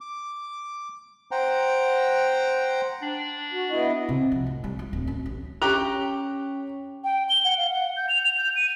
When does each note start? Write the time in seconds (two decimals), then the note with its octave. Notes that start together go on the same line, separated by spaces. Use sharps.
0.01 D6
1.31 C5 F#5 G5 A#5
3.02 D4
3.52 F#4
3.71 B3 E4 D#5
4.09 C3
4.32 F3
4.46 A2
4.64 G3
4.79 F4
4.93 D1
5.07 C#4
5.26 A1
5.62 C#4 G4 C#5 G5 A#5 F#6
7.04 G5
7.29 G7
7.45 F#5
7.58 F5
7.70 F#5
7.97 G6
8.09 F7
8.24 F7
8.38 G6
8.56 D#7